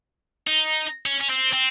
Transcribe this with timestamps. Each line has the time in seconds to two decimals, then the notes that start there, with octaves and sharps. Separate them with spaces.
0.47 D#4
1.06 C#4
1.21 C#4
1.30 C4
1.53 C4